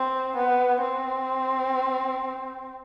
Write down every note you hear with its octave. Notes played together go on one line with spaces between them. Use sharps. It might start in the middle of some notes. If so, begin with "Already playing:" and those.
Already playing: C4
B3
C4